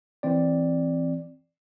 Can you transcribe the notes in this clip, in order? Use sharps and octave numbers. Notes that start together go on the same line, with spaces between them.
E3 C4 D5